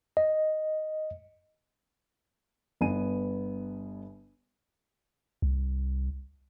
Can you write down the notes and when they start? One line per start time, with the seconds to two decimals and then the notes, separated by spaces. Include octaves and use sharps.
0.17 D#5
2.81 G1 B3 G#5 D#7
5.42 C2